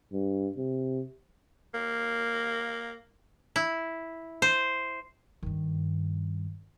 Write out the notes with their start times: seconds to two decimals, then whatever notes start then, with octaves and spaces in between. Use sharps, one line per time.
0.13 G2
0.58 C3
1.74 A#3
3.56 E4
4.42 C5
5.43 G2 D#3